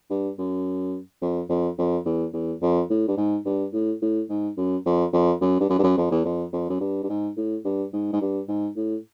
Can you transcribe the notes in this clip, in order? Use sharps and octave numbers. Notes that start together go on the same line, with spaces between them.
G2
F#2
F2
F2
F2
E2
E2
F2
A2
G2
G#2
G2
A2
A2
G#2
F#2
F2
F2
F#2
G2
F#2
G2
F#2
F2
E2
F2
F2
F#2
G2
G2
G#2
A2
G2
G#2
G#2
G2
G#2
A2